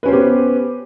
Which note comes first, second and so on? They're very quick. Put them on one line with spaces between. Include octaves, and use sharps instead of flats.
B4 C#4 C5 B3 G4